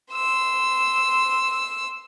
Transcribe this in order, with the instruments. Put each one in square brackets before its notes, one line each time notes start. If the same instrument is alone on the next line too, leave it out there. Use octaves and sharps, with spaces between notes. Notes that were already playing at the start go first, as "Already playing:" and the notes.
[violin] C6 E6